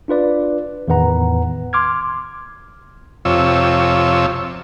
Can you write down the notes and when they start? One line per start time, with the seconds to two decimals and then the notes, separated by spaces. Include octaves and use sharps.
0.08 D4 F4 B4 D5
0.88 E2 A2 D#3 B4 F#5 A#5
1.73 C6 D6 F6 G#6
3.25 F2 C3 F4 C#5 E6